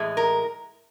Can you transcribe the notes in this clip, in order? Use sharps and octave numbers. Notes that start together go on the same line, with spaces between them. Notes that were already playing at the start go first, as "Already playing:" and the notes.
Already playing: A2 E3 G#3
A#4